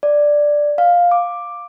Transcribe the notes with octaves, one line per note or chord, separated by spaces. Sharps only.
D5
F5
D6